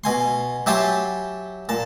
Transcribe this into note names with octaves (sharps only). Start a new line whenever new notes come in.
B2 G#5 C6
F#3 G4 E5 G#5 A5 C6
A#2 A5